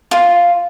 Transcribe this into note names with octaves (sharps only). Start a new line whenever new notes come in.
F4